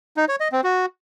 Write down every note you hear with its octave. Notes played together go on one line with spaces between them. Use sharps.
D#4
C#5
D#5
C4
F#4